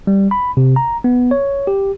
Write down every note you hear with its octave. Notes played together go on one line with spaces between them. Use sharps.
G3
B5
C3
A#5
B3
C#5
G4